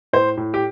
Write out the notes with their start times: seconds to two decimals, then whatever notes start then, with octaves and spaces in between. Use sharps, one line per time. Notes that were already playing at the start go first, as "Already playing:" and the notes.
0.13 A2 C5
0.37 A2
0.54 G4